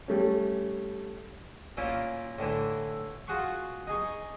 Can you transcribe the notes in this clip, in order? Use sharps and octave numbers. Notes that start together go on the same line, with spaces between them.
G3 A3 C#4
A#2 A#3 C#4 E4 F4
A2 D3 E3 E4
F4 F#4 G#4 F#5 C6 C#6
D#4 G#4 C#6